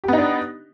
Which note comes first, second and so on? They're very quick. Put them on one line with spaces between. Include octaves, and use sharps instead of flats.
G4 B3 D#4 D4